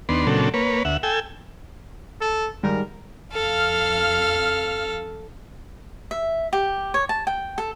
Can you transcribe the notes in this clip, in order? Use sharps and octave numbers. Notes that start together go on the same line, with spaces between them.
D#2 B3 D4 C6
A#2 C#3 F#3 C4 D4 A4
A#3 B4 C#5
D2 E5 F#5
A4 G5 G#5 E6
A4
G#2 D#3 G3 A#4
F2 A4 F5 F6
E5
G4
C#5
A5
G5
A4